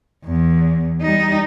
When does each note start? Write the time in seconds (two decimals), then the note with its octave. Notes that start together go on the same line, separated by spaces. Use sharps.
0.25 E2
1.01 G3 D#4